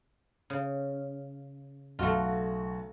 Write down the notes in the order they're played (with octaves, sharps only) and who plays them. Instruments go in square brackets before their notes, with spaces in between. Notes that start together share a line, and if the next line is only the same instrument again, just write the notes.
[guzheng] C#3
[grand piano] B1 F#4 [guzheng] A3 F4